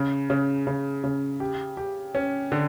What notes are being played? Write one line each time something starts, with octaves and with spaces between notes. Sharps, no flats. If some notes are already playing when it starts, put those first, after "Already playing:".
Already playing: C#3
C#3
C#3
C#3
G4
G4
C#4
D3